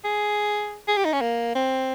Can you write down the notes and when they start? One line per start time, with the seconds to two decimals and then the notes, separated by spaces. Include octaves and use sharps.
0.04 G#4
0.88 G#4
0.97 G4
1.05 D#4
1.13 C#4
1.21 A#3
1.55 C4